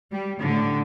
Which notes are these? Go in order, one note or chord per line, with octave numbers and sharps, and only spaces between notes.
G3
A2 D3